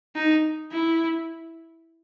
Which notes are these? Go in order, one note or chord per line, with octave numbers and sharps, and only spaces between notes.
D#4
E4